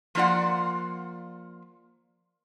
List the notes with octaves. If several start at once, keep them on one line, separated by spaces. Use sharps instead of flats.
F3 A#3 F4 D5 F#5